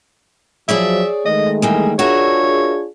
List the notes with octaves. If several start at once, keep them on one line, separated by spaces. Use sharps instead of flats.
F3 F#3 G#4 C#5 D5 E5
D#3 G#3 A3 D#5
E3 G3 A#3 G#4
D4 F4 F#4 G#4 A#4 C#5 E5